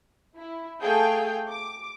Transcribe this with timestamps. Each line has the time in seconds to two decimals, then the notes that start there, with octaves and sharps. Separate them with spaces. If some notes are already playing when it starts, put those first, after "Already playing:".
0.36 E4
0.82 A3 G#4 A4 F5 G5 G6
1.48 D6